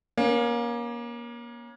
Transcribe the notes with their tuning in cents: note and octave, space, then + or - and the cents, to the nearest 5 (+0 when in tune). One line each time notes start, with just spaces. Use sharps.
A#3 +30 C#4 +0